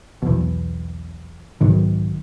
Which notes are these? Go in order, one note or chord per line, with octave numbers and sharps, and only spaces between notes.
B1 E2
B1 G#2 D#3